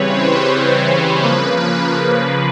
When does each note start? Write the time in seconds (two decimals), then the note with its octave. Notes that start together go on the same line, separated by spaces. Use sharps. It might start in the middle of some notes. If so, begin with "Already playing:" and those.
Already playing: C#3 E3 G3 C4 B4 C#5
0.11 C5
0.48 B4
0.85 C5
1.23 C#3 F3 A#3 B4